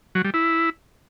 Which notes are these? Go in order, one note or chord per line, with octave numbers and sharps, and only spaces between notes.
F#3
G3
E4